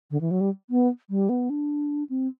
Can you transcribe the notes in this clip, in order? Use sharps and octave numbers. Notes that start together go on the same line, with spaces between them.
D3
E3
F#3
G3
B3
G3
B3
D4
C4